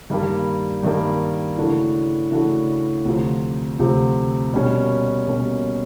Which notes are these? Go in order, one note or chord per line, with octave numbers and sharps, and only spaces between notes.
G2 D#3 G3 A#3
G2 D#3 G3 A#3
C#3 E3 A3 D4 F#4
C#3 E3 A3 D4 F#4
D2 C3 F3
D2 C3 F3
B2 G3 A#3 C#4
B2 G3 A#3 C#4